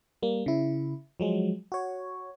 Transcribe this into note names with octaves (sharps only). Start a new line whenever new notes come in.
G3 A#3
C#3 E4
F3 F#3 G#3
F#4 C#5